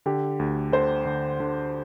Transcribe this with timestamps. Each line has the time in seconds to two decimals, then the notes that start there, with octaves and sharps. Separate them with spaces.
0.06 D3 G4
0.39 D2
0.72 D3 C5
1.06 D3
1.40 D3